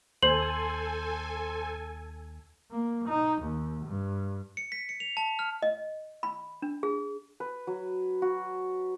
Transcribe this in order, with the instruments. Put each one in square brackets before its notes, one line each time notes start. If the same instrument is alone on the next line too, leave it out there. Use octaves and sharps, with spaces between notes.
[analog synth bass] D#2 [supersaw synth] A4 G#5 [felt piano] C5 [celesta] F#7
[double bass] A#3
D#4
D#2
G2
[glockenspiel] C#7
B6
C#7
F7
A5
F6
[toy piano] D#5
B5
D4
G#4
[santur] B4
F#3
F#4